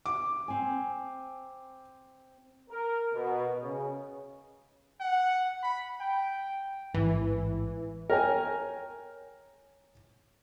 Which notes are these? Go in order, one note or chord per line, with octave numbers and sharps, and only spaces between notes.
D6
C4 G#5
A#4
B2
C#3
F#5
B5
G5
A1 G#2 E3
A#4 C#5 G5 G#5